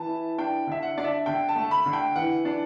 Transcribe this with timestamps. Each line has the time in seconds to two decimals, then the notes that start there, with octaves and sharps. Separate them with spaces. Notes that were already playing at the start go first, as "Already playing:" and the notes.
Already playing: E3 A5
0.09 E4
0.38 D4 G5
0.67 D3 E5
0.83 F#5
0.97 D4 D5
1.04 E5
1.26 D3 G5
1.49 A5
1.56 A3
1.71 B5
1.86 D3
1.93 G5
2.16 E3 F#5
2.45 D4